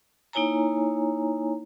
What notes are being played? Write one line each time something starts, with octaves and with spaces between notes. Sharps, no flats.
A#3 D#4 E4 C#5 G#5 A#5